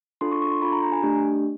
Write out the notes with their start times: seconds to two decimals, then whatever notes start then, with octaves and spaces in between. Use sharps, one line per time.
0.21 D4 F4 A4 C6
0.31 C#6
0.42 C#6
0.52 C6
0.62 D4 F4 A4 B5
0.72 A#5
0.83 A#5
0.92 G#5
1.03 A3 D4 G4